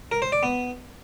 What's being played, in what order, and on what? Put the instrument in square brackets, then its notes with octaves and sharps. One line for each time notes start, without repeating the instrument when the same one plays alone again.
[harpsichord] A#4
C5
D5
B3